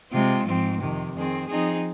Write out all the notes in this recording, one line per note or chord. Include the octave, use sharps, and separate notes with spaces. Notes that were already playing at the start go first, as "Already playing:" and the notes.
C3 G#3 C4 F4
G#2 F3 C4
F2 C3 D#3
F2 D#3 C4 G#4
F3 C4 D#4 G#4